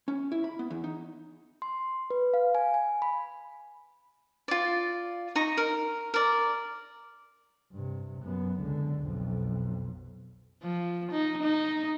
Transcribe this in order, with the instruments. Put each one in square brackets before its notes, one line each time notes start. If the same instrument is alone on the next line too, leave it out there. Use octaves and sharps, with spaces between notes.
[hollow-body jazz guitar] C#4
E4
B5
B3
E2
D#4
[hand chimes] C6
B4
F5
G#5
G#5
B5
[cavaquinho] F4 D5
D#4 A#5 C#6
A#4
A#4 D5
[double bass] G2 C3
F#2 B3
C#2 D3
B1 F2
[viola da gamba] F3
D#4
D#4